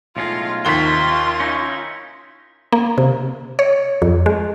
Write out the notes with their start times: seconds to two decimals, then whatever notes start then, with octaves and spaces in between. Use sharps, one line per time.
0.17 B1 A2 G#3 F4
0.65 D#2 C3 D#3 F4 B5 C6 G7
1.40 C#4 D#4 E4
2.72 A#3
2.98 C3
3.59 C#5
4.02 F2
4.26 G#3